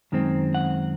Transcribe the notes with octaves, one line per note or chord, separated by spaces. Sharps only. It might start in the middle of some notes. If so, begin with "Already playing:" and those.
F#2 D#3 G#3 C4
F#5